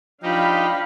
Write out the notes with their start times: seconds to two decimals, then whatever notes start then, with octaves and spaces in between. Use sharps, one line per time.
0.23 F3 D4 D#4 G4 F5 B5